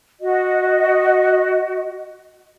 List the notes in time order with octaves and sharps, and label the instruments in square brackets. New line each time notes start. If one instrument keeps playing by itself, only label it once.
[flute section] F#4 D#5